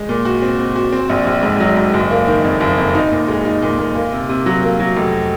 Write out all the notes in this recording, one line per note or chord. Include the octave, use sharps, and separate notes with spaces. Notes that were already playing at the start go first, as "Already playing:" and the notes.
Already playing: G#3
A#2
F#4
C4
C4
F#4
C4
A#1
A#1
G#2
F#3
G#2
F#1
A#3
D#3
F2
F#1
F2
D#4
A#2
G#3
D#4
A#2
A#2
A#3
C3
C3
F#3
A#3
F#3
F1